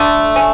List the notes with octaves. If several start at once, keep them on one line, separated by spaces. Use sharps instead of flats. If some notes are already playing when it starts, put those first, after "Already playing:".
Already playing: D3 A3
C#4